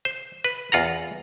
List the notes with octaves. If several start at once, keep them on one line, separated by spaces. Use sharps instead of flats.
C5
B4
E2 F4 F#5 A#5